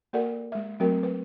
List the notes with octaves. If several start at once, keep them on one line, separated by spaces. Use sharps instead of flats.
A#3 F#4 A4 A#4 D5 F#5
G#3 E5
F#3 A3 C4 F#4 A#4 G5
B4